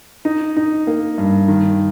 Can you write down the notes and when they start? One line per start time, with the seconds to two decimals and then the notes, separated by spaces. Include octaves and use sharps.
0.25 D#4
0.56 D#4
0.87 A#3
1.18 G2
1.48 D#3